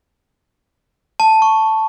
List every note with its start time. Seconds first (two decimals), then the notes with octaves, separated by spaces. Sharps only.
1.20 A5
1.42 C#6